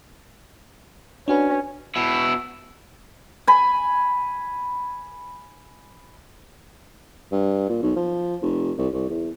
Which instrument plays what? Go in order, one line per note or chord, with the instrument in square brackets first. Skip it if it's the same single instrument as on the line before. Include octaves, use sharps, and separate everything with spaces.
[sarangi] C#4 [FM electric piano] D4 F#4 B4
[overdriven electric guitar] B2 E4
[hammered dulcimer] G#5 B5
[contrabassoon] G2
A#2
B1
F3
F1
C2
C2
E2